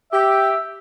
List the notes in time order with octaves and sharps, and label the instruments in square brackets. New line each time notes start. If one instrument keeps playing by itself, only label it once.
[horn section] G4 [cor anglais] E5